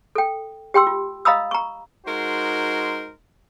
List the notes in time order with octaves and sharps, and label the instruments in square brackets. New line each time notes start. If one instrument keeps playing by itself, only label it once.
[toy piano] A4 G5
G4 G5 C6 E6
F4
D#5 F5 A#5 B5 D#6 E6
A#5 C#6
[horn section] G#3 D#4 F#4 A#4 C5 C6